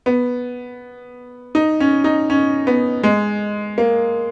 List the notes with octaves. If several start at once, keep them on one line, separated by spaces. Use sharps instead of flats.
B3
D#4
C#4
D#4
C#4
B3
G#3
A#3